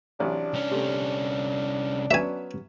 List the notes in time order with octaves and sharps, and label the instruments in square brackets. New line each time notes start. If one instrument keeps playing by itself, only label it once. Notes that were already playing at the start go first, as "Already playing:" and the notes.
[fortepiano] A1 C3 F#3 [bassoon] D4
[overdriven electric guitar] C2 C#4
[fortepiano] C3 A3
[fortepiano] F#3 B3 C#4 [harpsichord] E5 G#5